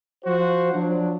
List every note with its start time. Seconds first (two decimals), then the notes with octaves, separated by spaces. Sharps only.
0.24 F3 F#4 C5
0.73 F3 F#3 D4